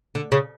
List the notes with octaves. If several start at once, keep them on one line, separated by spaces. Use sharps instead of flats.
D3
C#3